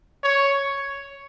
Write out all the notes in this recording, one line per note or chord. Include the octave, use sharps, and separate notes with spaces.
C#5